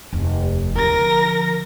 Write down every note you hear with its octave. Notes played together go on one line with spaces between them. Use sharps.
F1 D#2
D3 F3 A#4 A#6